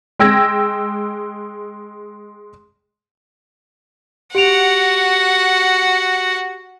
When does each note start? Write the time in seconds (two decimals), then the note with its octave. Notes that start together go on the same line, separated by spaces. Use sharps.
0.19 G#3 G5 E6 G#6 A#6
4.35 F#4 G4 F#5 D7 F7